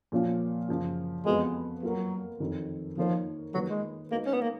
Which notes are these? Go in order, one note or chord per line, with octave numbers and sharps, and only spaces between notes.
A#2 F3 A#3 C#4 F4
F#2 C#3 F3
F2 F3 G#3 B3 F#4 B4
F#3 A#3 F4 A#4
F2 D#3 F#3 C#4
D#3 F3 A#3 D#4 A#4 C#5
D#3 F#3 A#3 F4 B4
G#3
G#3 A#3 D#4 F#4 B4 D#5
C#4
B3
A#3